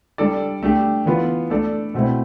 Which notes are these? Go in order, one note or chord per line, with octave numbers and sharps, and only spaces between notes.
G3 D4 A4 D5
A3 D4 G4
E3 B3 F4
A3 D4 A4 D5
B2 A3 C4 E4